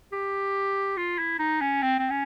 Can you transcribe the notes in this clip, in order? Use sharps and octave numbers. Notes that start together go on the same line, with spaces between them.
G4
F4
E4
D#4
C#4
C4
C4
C#4